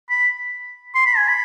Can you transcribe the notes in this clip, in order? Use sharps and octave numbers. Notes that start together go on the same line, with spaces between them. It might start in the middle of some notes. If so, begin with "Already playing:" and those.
B5
C6
B5
G#5
B5